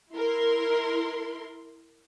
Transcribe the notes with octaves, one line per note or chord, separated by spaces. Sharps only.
E4 A#4 C6